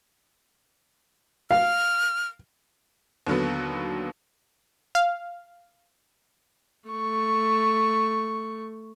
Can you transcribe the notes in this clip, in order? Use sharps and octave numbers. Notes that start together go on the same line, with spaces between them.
F5 F6
D#2 D3 F#3 B3
F5
A3 C#6